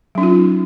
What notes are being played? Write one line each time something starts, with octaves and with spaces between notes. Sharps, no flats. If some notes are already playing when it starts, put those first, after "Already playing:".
F#3 C#4 D#4 F4